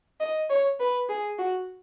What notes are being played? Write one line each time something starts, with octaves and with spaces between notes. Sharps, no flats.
D#5
C#5
B4
G#4
F#4